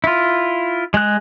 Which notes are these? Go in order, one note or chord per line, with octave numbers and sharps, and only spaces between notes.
E4 F4
G#3 F#6